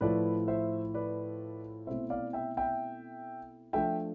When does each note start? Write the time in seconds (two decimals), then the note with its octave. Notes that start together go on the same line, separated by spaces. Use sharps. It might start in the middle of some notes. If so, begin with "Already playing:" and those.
0.01 A2 F3 A3 E4 B4 D5
0.48 C5 E5
0.94 B4 D5
1.87 B2 A3 C4 E4 C5 E5
2.10 D5 F5
2.33 E5 G5
2.57 E5 G5
3.73 F3 A3 D4 E5 G5